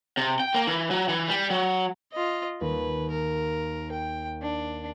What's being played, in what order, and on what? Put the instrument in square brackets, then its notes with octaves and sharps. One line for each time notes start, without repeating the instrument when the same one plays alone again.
[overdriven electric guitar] C3
G5
A#3
E3
F#3
E3
G3
F#3
[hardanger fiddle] F4 D#5
[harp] D#2 [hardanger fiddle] B4
[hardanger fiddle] A#4
G5
D4